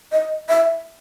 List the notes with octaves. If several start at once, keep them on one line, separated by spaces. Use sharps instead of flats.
D#5
E5